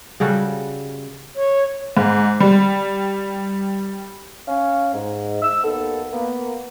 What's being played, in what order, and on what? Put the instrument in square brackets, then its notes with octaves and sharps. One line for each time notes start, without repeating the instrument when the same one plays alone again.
[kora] C#3 G3 F#4 A4
[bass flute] C#5
[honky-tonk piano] G#2
G3
[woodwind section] C#4 F5
G#2
E6
D#2 D#3 B3 A4
A#3 B3